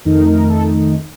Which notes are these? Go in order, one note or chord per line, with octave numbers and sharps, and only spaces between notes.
F2 D#3 A3 D#4 A#4
A#4
A4